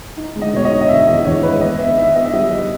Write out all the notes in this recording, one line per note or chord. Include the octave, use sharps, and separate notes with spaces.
D#4
G#3
D#5
B2 C#5
D#5
D#4
D#5
B2 E5
E2 D#5
D#5
E2 C#5
G#3 B4
B3 D#5
B3 E5
D#3 E5
B3 D#5
E5
G3 D#5
G3